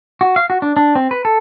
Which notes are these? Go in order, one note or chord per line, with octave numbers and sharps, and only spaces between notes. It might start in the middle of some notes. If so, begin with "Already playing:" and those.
F#4
F5
F#4
D4
D4
C4
B4
A4